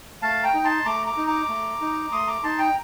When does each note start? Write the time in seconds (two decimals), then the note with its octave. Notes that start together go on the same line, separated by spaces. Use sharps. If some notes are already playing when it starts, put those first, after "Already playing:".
0.22 A3 F5 A5
0.43 G5 A#5
0.54 D#4
0.64 A5 C6
0.85 A3 A#5 D6
1.07 A#5 D6
1.17 D#4
1.28 A#5 D6
1.49 A3
1.81 D#4
2.12 A3 C6 D#6
2.27 A#5 D6
2.43 D#4 A5 C6
2.58 G5 A#5